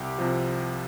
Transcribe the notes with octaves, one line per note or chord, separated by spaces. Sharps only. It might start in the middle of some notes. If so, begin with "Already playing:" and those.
Already playing: C2 G4
C3 F3